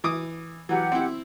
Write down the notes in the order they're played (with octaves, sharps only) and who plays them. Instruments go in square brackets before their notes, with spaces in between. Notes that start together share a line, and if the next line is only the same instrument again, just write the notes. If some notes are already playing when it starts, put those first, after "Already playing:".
[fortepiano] E3 D6 D#6
[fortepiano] E3 F#3 [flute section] G4 F#5
[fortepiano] C4 E4